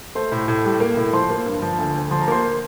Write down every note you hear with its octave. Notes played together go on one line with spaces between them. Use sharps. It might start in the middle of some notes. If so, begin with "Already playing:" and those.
A3 C5 C6
A2
A2
G3
A#3
A2
F3 C5 C6
A#3
G2
F3
D2
D2
F3 C6
A#5
A#3 C5 C6